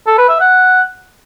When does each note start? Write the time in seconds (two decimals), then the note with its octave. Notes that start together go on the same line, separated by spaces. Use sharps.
0.07 A4
0.18 B4
0.29 E5
0.40 F#5